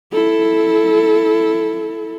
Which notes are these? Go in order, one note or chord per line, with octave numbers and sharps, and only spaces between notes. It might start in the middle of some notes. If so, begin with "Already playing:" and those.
E4 A4